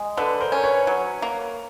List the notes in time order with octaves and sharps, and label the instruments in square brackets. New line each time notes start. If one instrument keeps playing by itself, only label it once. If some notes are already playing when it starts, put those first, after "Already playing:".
Already playing: [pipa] G#3
[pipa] D3 [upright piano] A4 B4
[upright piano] A#4 C5
[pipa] C#4
[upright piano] B4 C#5
[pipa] F#3
A#3